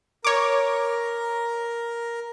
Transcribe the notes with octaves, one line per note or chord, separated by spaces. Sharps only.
A#4 C#5 D6